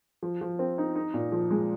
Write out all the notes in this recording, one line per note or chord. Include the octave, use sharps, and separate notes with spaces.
F3
F3
C4
D#4
D#4
A#2
F3
G#3